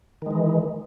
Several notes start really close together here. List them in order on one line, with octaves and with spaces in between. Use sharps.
D#3 G#3 E3